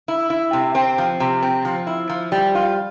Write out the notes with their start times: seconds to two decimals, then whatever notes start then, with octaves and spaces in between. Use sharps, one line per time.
0.08 E4
0.30 E4
0.53 C3
0.75 C4
0.98 F3
1.20 C3
1.42 C4
1.65 F3
1.87 E4
2.09 F3
2.32 G3
2.55 F4